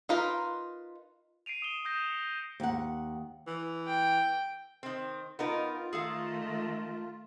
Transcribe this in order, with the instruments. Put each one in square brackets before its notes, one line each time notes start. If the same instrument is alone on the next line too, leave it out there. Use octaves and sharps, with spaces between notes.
[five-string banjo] D#4 F4 A#4 B4
[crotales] C7 D7 D#7 F7
D#6 E7 G7
D#6 G6 A#6 D#7
C#7
[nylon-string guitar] D#2 F#5
[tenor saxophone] E3
[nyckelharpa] G5
[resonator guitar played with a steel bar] D#3 C4
[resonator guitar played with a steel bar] B3 D#4 A#4 [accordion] F4
[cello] D#3 A3 [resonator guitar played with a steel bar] G#4 A4 F5